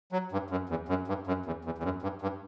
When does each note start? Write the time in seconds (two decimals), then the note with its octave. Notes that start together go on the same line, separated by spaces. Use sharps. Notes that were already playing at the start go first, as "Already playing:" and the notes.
0.12 F#3
0.32 G2
0.50 F#2
0.69 E2
0.88 F#2
1.08 G2
1.27 F#2
1.46 E2
1.65 E2
1.78 E2
1.83 F#2
2.02 G2
2.22 G2